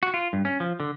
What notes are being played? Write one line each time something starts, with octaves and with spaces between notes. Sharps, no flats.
F#4
F4
G2
C#4
F3
D3